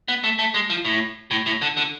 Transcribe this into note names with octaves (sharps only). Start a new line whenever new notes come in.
B3
A3
A3
G#3
F3
A2
A2
A2
D3
D3